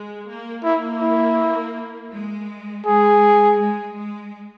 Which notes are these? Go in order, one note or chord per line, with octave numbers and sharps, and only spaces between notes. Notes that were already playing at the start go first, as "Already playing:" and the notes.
Already playing: G#3
A#3
A#3 E4
E4
G#3
G#3 G#4
G#3
G#3